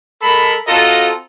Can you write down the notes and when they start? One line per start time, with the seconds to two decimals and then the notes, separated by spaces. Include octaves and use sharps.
0.21 G#3 A4 A#4 B5
0.68 C4 F4 F#4 A4 D#5 A#5